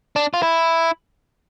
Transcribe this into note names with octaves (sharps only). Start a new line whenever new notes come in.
D4
F4
E4